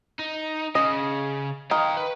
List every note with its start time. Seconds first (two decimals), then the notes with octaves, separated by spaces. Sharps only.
0.19 D#4
0.75 C#3 D#5
1.71 D#3 F5 G5
1.97 B4